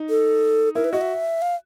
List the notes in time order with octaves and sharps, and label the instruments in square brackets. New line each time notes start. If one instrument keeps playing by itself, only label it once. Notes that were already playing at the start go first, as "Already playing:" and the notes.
Already playing: [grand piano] D#4
[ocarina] A4
[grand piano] E4 [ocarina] A#4
[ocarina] B4
[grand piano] F#4 [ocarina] D#5
[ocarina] E5
F5